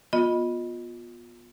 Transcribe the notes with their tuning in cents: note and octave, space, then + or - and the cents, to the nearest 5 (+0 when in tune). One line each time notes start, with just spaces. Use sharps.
B3 -20 F4 +25 D#5 +0